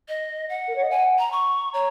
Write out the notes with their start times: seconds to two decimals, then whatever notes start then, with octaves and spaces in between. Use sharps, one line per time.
0.08 D#5
0.49 F#5
0.68 A#4
0.75 C#5
0.83 D#5
0.91 F#5 G#5
1.19 A#5
1.32 C#6
1.73 C#5 A#5